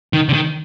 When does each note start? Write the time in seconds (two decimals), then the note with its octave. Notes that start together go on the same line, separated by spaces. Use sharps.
0.13 D#3
0.29 D3
0.33 D#3